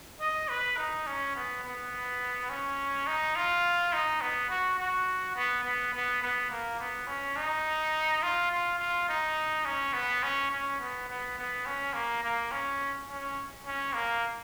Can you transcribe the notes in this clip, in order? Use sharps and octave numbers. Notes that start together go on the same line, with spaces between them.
D#5
B4
D#4
C#4
B3
B3
C#4
D#4
F4
D#4
B3
F#4
F#4
B3
B3
B3
B3
A#3
B3
C#4
D#4
F4
F4
F4
D#4
C#4
B3
C#4
C#4
B3
B3
B3
C#4
A#3
A#3
C#4
C#4
C#4
A#3